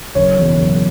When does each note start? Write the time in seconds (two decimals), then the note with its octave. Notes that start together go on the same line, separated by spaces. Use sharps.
0.15 F#1 C#5
0.37 E2 B2 F#3
0.58 F#1